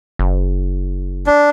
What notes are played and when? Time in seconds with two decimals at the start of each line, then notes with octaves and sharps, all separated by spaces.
0.19 F#1
1.26 D4